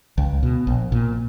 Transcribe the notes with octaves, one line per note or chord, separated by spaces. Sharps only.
C#2
B2
A#1
A#2